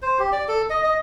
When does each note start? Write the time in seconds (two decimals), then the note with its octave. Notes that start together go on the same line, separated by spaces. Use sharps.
0.02 C5
0.19 G4
0.32 D5
0.48 A4
0.70 D#5
0.84 D#5